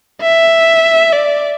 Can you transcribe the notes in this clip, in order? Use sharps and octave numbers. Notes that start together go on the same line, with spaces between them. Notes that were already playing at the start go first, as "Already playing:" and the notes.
E5
D5